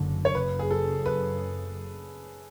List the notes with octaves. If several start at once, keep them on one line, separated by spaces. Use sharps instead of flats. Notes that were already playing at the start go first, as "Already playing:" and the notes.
Already playing: F#1 F#2 D3
C#5
F#1 F#2 C#3 B4
G#4
A4
B4